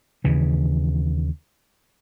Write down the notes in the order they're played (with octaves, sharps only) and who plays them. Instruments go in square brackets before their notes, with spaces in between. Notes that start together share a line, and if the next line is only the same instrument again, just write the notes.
[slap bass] D#2 C#3 E3